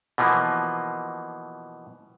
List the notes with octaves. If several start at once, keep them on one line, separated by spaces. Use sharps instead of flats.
B2 E3 F3 A#3